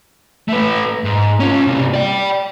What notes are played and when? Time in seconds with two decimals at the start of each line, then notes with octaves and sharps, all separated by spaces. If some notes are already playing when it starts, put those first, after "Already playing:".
0.48 A3 B4
1.05 G#2
1.40 C#4 F4
1.67 C3 A#3
1.94 D5 G5